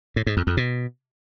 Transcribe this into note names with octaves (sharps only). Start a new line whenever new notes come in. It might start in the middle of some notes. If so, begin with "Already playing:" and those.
A2
G#2
F2
F2
B2